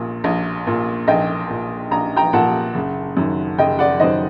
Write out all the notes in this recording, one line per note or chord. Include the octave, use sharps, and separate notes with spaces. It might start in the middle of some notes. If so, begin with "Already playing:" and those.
Already playing: A#1 A#2
A#1
A#2
A#1 D#5 G5
A#2
A#1 A#5
G5 A#5
A#2 F#5 A5
F#1
F#2 D#3
F#1 D#5 G5
D5 F#5
F#2 D#3 C5 D#5